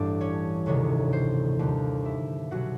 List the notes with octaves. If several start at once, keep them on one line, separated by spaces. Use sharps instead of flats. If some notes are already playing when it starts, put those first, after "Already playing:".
Already playing: A1 G2 E3 G3 C4 D4 D5
C#4 C#5
E1 D2 C3 D#3 C#4 C#5
C5
D#2 D3 G3 A#3
E4 E5
C2 B2 F#3 F#4 F#5